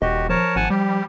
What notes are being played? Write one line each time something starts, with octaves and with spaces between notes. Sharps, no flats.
D#1 F#4 G4 D#5
F3 A#4 C#5 A5
G#1 F#5 G#5 A5
G3 G4